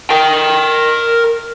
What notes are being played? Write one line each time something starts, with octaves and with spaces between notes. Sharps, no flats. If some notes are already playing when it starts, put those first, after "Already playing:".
A#4 G5